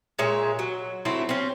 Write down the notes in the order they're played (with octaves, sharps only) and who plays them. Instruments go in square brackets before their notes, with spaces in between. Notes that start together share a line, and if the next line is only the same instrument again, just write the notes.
[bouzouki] A#2 G#3 C#5 E5
F#3
F#3 A3 C4 E4
C4 C#4